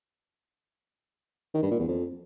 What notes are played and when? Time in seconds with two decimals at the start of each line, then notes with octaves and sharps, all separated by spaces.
1.54 D#3
1.63 G2
1.71 A#2
1.80 E2
1.88 F2